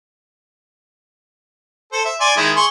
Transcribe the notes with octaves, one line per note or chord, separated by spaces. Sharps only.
A4 C5
E5
D5 G#5 C6
D#3 G#3 E4
G#4 C6 C#6